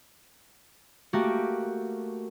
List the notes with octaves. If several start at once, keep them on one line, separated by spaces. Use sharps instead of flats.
A3 A#3 F#4 G4